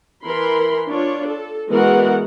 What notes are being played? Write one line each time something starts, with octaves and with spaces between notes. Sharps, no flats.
E3 A#4 B5 C6
D4 F4 C#5
A4
E3 G#3 B3 F#4 A#4 F#5